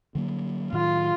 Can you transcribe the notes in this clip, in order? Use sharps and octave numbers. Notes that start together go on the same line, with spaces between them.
D3 F#3 A#3
A2 D#3 F#3 F4